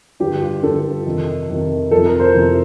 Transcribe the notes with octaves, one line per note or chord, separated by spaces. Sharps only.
G2 D3 F3 G4
F4
G2 D3 F3 A4
F2 C3 D#3
F2 C3 D#3
F2 C3 F3 A4
A#4
C5
F2 C3 F3